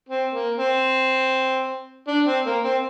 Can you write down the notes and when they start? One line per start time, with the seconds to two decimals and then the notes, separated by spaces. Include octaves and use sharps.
0.09 C4
0.33 A#3
0.58 C4
2.08 D4
2.27 C4
2.46 A#3
2.64 C4